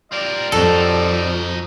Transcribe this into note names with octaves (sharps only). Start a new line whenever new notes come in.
G3 C4 F4 A#4 D5
F2 D#4 F#4 A4